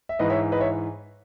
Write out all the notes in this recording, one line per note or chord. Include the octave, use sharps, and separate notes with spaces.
E5
G#2 E3 B4 D#5
C#5 E5
B4 D#5
C#5 E5